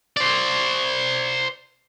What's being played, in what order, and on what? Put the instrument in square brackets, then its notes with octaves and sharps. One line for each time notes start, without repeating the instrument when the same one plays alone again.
[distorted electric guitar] C5 D5